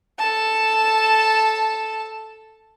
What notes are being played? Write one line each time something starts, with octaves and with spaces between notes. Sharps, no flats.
A4 A5